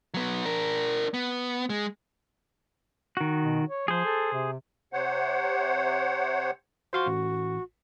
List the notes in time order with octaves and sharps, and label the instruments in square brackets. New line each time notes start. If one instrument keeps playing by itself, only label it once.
[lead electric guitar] F#3 B3
D4 A#4
B3
G#3
[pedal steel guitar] D#3 F#4
[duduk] B2
C#5
[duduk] F3 [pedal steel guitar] G#4 C5
[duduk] A4
C3
[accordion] C3 C5 C#5 F#5
[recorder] F#4 [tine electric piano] C5 F5 C6
[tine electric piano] A1